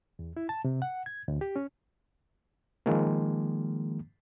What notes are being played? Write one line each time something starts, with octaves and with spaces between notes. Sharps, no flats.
E2
E4
A5
C3
F#5
G#6
D2
G4
C#4
D#3 F3 G#3 A#3